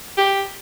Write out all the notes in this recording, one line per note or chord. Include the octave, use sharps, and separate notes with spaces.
G4